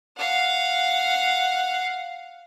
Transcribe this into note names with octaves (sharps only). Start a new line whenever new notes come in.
F5 F#5